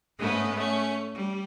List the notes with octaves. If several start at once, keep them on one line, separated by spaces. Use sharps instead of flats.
G#2 G#3 A3 B3 C#4
A3 C#4
G3